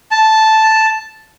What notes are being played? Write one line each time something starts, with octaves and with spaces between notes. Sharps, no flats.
A5